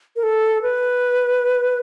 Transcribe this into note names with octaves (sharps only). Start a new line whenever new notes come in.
A#4
A4
B4